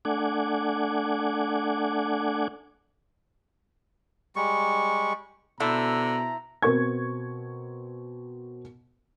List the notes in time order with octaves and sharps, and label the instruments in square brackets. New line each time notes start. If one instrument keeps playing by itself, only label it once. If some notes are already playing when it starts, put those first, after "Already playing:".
[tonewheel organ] A3 D4 F#5 G#5 D6
[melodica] G3 G#3 C#6
[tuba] B2 [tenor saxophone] D3 [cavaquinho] E4 A4 C5 [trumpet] A#5
[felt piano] B2 C4 A#4 C#6 G#6